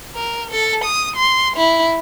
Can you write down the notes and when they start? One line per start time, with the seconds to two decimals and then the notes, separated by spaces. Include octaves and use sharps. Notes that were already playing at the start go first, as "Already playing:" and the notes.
0.15 A#4
0.50 A4
0.84 D#6
1.15 C6
1.56 E4